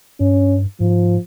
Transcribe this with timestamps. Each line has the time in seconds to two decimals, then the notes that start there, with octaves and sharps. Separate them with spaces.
0.20 G2 C#4
0.80 G#2 F3